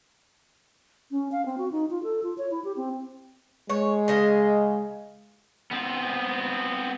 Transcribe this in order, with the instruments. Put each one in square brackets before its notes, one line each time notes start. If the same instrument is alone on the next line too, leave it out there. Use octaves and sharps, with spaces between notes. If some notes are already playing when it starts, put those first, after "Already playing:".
[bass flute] C#4
F5
C4
F#4
D#4
F4
A4
F4
C#5
E4
G4
C4
[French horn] G#3 [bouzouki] C#5
[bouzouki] C#3 D#5 F5
[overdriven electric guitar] B3 C4